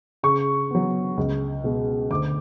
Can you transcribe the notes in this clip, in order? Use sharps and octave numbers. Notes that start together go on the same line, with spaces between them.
C#3 C#6
F#3 B3
C#2
B2 G#3
D2 D6